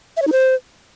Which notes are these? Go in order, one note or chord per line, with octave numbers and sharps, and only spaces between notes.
E5
C#5
D#4
C5